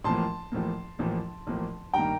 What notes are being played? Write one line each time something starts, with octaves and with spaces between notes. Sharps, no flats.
A1 A2 F3 A#3 A5 C6
A1 A2 F3 A#3
A1 A2 F3 A#3
A1 A2 F3 A#3
G2 D#3 A#3 G5 A#5